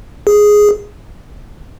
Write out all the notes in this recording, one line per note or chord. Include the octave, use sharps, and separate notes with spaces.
G#4